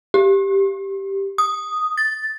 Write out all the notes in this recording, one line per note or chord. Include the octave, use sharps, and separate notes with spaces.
G4
D#6
A6